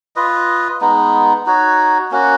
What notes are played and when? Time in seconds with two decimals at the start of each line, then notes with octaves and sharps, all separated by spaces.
0.16 F4 B4 D#5
0.81 G#3 B3 D#4
1.46 D#4 F#4 C#5
2.11 A#3 C#4 F#4